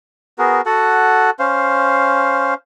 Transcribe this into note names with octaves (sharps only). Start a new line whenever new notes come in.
B3 F#4 G#4 A#4
F#4 A4 F#5
C#4 C5 F5